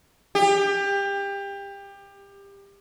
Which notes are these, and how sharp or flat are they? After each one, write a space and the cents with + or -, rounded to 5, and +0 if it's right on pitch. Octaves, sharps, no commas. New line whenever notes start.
G4 +25